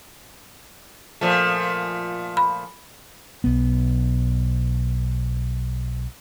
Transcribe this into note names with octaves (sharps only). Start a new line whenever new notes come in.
A#2 F3 A3
B5
B1 B3